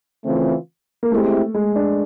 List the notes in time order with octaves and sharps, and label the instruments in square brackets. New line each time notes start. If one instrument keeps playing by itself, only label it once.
[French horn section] C#3 E3 A3 C4 F4
[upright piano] A#3
[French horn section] G#3 C4 E4 G4 [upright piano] A3
[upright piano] G#3
D4